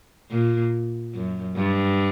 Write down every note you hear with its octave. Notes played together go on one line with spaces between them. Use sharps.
A#2
F#2
G2